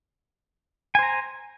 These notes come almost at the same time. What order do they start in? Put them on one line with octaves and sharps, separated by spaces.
G#5 C5 A#5